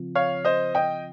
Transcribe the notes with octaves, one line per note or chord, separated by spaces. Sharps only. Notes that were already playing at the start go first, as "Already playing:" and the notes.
Already playing: C#3 F3 C4 F4
C#5 F5
C5 D#5
D#5 G5